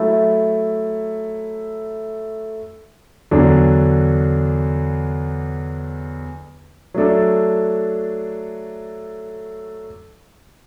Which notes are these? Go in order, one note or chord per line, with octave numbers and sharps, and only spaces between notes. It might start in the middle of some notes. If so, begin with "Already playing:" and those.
Already playing: F#3 A3 E4
E2 D3 F#3 D4
F#3 A3 D4 A4